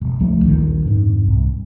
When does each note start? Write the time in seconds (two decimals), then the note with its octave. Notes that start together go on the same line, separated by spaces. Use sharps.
0.01 E1
0.20 C#2 F3 A3
0.45 D#1 A#1 D#3
0.86 F2 G#2
1.26 C2